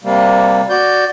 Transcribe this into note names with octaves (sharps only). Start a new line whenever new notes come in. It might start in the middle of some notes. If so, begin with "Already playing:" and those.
C3 G3 A#3
F#4 D5 G6